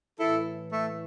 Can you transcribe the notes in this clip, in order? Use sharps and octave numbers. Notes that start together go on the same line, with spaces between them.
A2 E3 E4 A4
A3